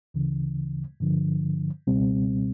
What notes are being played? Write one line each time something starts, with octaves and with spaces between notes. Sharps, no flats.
D2 C#3 E3
G2 D3 F3
C#2 B2 G3 C4